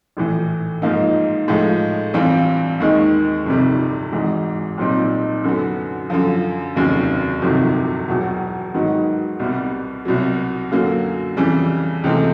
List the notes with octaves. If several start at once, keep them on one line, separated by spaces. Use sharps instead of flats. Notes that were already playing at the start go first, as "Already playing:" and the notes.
A#1 A2 E3
G#2 F3 A#3 D#4
A2 F3 G#3
G2 E3 G3 C4 F4
D#2 D#3 G#3
G1 F2 C3 D#3 G3
G#1 G#2 E3
B1 A#2 G3 C4 D#4
F#2 D3 F#3 B3
F#2 D3 F3
F1 D#2 C#3 F#3
G1 F2 C3 D#3 F#3
E1 E2 B2 F#3
G#2 D#3 F#3 B3
C2 B2 G3 B3
C2 B2 F#3
F#2 D3 F#3 A#3
F2 C#3 E3 G3
C#2 C3 E3 A3 C4